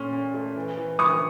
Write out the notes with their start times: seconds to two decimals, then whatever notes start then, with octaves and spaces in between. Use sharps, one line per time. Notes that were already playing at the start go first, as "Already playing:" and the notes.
Already playing: A#2 A3 C#4
0.13 C#4
0.34 A3
0.56 E3
0.77 E3
0.99 E3 C#6 D#6